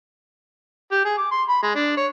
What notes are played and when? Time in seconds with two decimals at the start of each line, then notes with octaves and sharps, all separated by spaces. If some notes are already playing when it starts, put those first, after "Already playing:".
0.91 G4
1.05 G#4
1.17 D6
1.31 C6
1.48 B5
1.63 G#3
1.75 D4
1.97 C#5